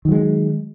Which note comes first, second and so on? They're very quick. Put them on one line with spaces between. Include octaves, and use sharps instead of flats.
D#3 F#3 G#3